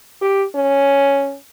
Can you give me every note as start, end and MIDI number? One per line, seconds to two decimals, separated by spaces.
0.21 0.45 67
0.55 1.35 61